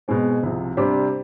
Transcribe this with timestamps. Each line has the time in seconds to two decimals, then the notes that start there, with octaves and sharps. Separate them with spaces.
0.08 B2 G#3 C4
0.43 C2 C3 F3
0.77 C3 G3 D4 G4 C5